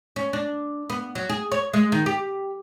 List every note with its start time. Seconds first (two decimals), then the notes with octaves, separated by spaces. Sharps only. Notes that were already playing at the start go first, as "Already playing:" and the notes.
0.16 C#4
0.33 D4
0.90 B3
1.15 F#3
1.29 G#4
1.52 C#5
1.73 G#3
1.92 D#3
2.06 G4